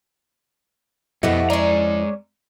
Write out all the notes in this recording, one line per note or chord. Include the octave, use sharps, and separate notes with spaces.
F2 B2 A3 E4 G4 D#5 F#5
G#3 C#4 D5 A#5